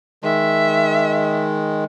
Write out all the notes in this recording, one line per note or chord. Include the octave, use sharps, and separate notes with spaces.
D#3 G#3 E5